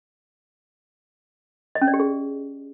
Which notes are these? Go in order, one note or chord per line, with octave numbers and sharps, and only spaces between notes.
D#5
C#4
D5
G4
G#4